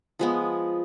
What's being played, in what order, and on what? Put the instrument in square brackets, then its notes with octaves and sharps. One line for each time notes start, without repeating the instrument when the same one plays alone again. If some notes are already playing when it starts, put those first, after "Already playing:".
[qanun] F3 G#3 B3